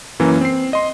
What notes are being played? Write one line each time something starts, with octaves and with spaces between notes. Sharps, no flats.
F#2 E3 A#3 C#4
C4 C7
D#5 C6